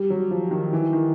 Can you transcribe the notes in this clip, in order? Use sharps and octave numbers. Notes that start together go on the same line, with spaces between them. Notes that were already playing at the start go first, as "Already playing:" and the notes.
Already playing: G3
F#3
F3
D#3
E3
D#3